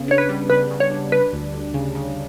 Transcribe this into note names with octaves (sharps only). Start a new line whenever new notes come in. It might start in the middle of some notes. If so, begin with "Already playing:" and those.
Already playing: C#3 B3
D4 C#5
B4
G3
C#3 B4
C#3
C#5
D4
G3 B4
D2
D2
C#3
C#3